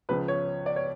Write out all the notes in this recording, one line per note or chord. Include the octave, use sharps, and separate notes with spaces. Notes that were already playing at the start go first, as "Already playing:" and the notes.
C#2 C#3 F3 B4
C#5
D5
C#5